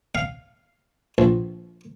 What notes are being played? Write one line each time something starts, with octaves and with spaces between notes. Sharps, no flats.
F5
A#1